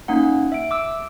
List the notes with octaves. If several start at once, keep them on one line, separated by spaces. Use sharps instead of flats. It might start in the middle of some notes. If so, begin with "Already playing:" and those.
A#3 C#4 D#4 F#5
E5 D7
D6 E6